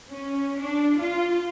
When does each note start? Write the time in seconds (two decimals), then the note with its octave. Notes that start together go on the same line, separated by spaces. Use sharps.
0.10 C#4
0.59 D4
0.97 F4